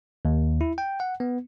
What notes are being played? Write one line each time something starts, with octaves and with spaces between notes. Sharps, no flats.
D#2
E4
G5
F#5
B3